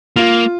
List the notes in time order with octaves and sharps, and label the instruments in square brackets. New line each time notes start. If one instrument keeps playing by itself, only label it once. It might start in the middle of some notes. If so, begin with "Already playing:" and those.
[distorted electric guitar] A#3 [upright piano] F4